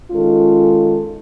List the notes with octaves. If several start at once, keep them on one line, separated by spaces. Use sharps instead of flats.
D#3 G#3 C#4 F4 A4